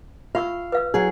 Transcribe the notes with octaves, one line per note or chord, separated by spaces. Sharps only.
F4 F5 C#6 E6
B4 F5 E6
F#3 G#4